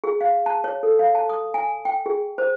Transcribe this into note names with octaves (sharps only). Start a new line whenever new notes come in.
G#4
F5
A5
C#5
A4
F5
A5
D#6
G#5
G5
G#4
C5